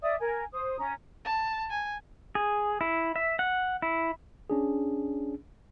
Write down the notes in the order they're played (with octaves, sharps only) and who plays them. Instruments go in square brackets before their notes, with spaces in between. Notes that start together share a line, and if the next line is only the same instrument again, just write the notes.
[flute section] D5 E5 D#6
A#4 G#5
C5 D#6
C#4 A#5
[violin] A5
G#5
[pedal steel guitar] G#4
E4
E5
F#5
E4
[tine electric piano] C#4 D4 G#4